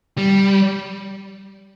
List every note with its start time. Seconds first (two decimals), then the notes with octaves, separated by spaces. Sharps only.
0.18 G3